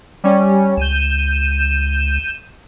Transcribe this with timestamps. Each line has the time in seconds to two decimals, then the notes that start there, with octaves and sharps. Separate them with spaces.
0.24 G3 C#4
0.77 C#2 G6 D#7 E7